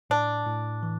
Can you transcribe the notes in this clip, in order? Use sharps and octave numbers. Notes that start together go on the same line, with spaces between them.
A2 D4
A2
E3